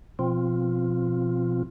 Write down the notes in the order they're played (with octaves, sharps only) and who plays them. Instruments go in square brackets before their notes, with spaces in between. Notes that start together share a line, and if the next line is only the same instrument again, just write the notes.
[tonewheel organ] B2 F3 C4 F4